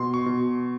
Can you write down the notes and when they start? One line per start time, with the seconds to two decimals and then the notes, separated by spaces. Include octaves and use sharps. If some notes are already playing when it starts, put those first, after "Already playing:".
Already playing: B2 C6
0.14 C#6
0.26 B2